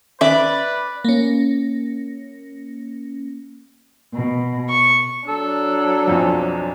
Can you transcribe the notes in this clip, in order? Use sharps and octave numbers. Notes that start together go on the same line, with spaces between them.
D#3 C#4 B4 D5 E5
A#3 C#4
B2
C#6
F#3 D4 A4
B1 F2 F3